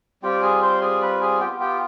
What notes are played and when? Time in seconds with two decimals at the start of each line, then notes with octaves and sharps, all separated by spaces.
0.22 G3 C4 F4 G4 G5
0.42 G#4 G#5
0.62 C5 C6
0.81 G#4 G#5
1.01 B4 B5
1.21 G#4 G#5
1.40 B3 F4 G4 G5
1.60 G4 G5